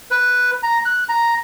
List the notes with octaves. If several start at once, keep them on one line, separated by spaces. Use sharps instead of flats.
B4
A#5
F#6
A#5